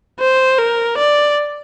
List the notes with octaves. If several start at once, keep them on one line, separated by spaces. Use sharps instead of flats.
C5
A#4
D5